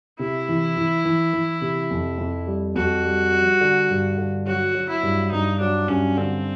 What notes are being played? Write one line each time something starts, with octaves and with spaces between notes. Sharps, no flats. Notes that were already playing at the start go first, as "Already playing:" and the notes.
C3 E4
E3
E3
E3
E3
C3
F2
F2
G3
F2 F#4
G3
G3
D3
G2
D3
F#3 F#4
F#3
E4
G2
G2 D#4
F#3 D4
G2 C#4
D3 C4